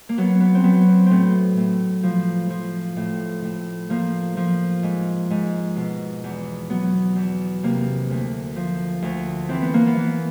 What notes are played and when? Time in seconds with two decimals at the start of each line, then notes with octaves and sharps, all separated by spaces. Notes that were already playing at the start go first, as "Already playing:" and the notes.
0.09 A#3
0.18 F#3 B3
0.40 B3
0.55 C4
0.64 F#3 B3
0.88 C4
1.06 A2 B3 C4
1.57 A2
2.03 F3
2.50 F3
2.97 A2
3.44 A2
3.90 F3 A#3
4.37 F3
4.83 G#2
5.30 G#2
5.76 B2
6.24 E2
6.70 F#3 B3
7.16 E2
7.63 C3 A#3
8.10 D2
8.56 F3
9.02 D2
9.49 E3 C4
9.62 B3
9.74 A#3
9.86 B3
9.97 E3